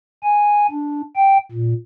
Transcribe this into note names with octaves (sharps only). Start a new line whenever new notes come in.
G#5
D4
G5
A#2